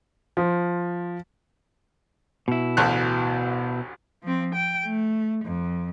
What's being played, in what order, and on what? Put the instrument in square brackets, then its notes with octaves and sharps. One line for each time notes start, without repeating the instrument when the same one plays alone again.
[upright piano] F3
[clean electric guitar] B2 E4
[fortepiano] A1 D2 F#6
[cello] F3 C4
G5
A3
F2